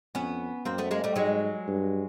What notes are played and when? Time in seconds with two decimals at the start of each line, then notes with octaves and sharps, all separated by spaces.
0.15 F2 B3 C#4
0.65 F#2 A#3 C4
0.78 A3 B3
0.91 G#3 A#3
1.04 G3 A3
1.16 G#2 F#3 G#3
1.67 G2